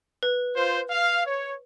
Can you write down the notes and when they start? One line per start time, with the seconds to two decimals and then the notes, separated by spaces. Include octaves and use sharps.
0.23 B4
0.55 F4 C5
0.90 F5
1.26 C#5